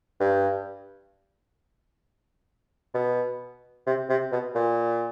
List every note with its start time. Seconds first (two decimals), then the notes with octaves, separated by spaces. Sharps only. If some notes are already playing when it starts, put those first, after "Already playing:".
0.20 G2
2.94 B2
3.87 C3
4.09 C3
4.32 B2
4.55 A#2